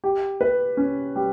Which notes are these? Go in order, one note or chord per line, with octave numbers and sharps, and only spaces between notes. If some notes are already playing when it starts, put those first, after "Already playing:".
G4
B4
C#4
G3